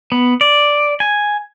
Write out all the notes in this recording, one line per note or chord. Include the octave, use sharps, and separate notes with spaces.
B3
D5
G#5